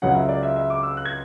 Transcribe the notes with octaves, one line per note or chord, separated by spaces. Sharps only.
C#2 C#3 F#3 C#4 F#5
E5
D5
E5
E5
D6
E6
F#6
G#6